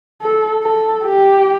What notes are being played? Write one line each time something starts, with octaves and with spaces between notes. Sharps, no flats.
A4
A4
G4